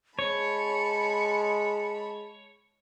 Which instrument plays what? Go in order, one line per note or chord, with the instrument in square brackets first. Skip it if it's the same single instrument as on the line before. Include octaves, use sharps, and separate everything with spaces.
[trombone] G#3 [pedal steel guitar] C#5 [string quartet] A5 B5 [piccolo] C#7